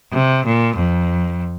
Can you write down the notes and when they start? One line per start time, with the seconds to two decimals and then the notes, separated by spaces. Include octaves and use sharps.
0.12 C3
0.44 A#2
0.75 F2